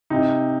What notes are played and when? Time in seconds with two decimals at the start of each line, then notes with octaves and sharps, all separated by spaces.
0.10 C3 D#4